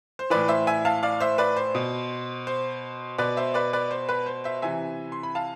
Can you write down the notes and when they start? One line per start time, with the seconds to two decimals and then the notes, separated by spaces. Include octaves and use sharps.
0.19 C5
0.30 A2 E3 B4 D5
0.48 C5 E5
0.67 E5 G#5
0.85 F5 A5
1.03 D5 F5
1.20 C5 E5
1.38 B4 D5
1.56 C5
1.75 B2
2.47 C5
3.18 B2 B4 D5
3.37 C5 E5
3.54 B4 D5
3.73 B4 D5
3.91 C5
4.09 B4
4.26 C5
4.44 C5 E5
4.62 C3 E3 E5 G#5
5.12 C6
5.23 B5
5.35 F5 A5